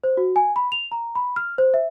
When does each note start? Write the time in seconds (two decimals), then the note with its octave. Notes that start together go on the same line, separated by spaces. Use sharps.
0.04 C5
0.17 F#4
0.36 G#5
0.56 B5
0.72 F7
0.92 A#5
1.15 B5
1.36 F6
1.58 C5
1.74 E5